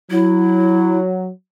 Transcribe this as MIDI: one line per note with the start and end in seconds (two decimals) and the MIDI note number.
0.11 1.29 54
0.11 0.98 64